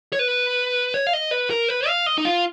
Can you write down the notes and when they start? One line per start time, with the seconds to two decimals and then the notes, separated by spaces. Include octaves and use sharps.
0.13 C#5
0.19 B4
0.94 C#5
1.07 F5
1.13 D#5
1.31 B4
1.50 A#4
1.68 B4
1.87 F5
2.06 D#5
2.18 D#4
2.25 F4